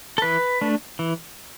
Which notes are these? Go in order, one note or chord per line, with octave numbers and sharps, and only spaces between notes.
A4
E3 B4
A3 D4
E3